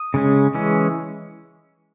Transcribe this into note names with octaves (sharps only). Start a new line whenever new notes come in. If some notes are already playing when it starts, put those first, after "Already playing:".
Already playing: D#6
C#3 G#3 C#4
E3 G#3 C#4